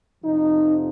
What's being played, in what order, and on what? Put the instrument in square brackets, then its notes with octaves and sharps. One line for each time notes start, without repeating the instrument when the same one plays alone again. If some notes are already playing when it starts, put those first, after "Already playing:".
[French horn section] F2 C3 F3 D#4